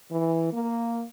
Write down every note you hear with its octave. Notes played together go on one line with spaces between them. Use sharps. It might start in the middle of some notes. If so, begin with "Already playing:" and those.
E3
A#3